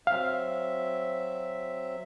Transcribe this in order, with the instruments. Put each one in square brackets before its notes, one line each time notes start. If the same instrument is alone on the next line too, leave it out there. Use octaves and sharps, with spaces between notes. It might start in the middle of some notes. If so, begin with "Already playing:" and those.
[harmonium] F#3 C4 E5 [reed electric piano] F5